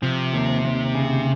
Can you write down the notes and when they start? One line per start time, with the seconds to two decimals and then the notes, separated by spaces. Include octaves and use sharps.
0.02 C3 F3
0.33 D#2
0.64 D#2
0.95 C#3